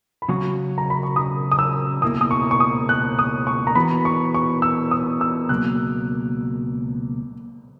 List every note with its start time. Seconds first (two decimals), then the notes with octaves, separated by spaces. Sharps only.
0.22 B5
0.29 C#3 F#3 C#4 F#4 C#6
0.78 A#5
0.90 B5
1.03 C#6
1.16 D#6
1.52 D#6
1.59 E6
2.02 C#2 B2 A#3 E4 A#4 D#6
2.21 D#6
2.31 C#6
2.51 C#6
2.60 D#6
2.89 F#6
3.19 D#6
3.47 C#6
3.67 A#5
3.75 E3 B3 F#4 B5
4.05 C#6
4.34 C#6
4.62 E6
4.91 D#6
5.21 E6
5.49 C#2 B2 F#3 A#3 F#6